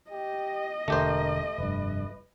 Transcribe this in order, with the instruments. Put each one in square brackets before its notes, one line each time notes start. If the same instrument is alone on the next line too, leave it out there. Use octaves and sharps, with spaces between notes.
[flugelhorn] G4 [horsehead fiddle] D#5
[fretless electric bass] E1 D3 [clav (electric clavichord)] A3 G4 C5 [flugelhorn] A#4
[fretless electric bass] F1 G2 [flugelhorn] B4